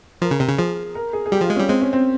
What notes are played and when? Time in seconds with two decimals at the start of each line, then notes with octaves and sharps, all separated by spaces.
0.22 F3 A#4
0.31 C#3
0.40 C3
0.49 C#3
0.58 F3 G#4
0.95 A#4
1.13 G#4
1.26 G#4
1.32 G3 G4
1.41 F3 F4
1.50 G#3
1.56 G3 C#4
1.69 G#3 C4
1.81 C#4
1.93 C4